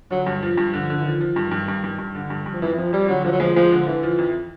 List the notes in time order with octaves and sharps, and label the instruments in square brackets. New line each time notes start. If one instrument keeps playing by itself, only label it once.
[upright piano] D3 [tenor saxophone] F#3
[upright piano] G2
F3
G2
[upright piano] D3 [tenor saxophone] F3
[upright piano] D3
[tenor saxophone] E3
[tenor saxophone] D#3 [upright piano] F3
[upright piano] F3
G2
G2
G2
G2
G2
D3
G2
G2
[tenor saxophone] F3
[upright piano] F2 [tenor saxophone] E3
[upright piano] F2 [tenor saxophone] F3
[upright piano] F2 [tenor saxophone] G3
[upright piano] D3 [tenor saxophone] F#3
[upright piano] D3 [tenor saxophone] F3
[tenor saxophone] F#3
[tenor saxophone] F3 [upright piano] G#3
[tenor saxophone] F3 [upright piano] G#3
[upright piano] D3
[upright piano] D3 [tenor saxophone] E3
[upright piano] F3
F2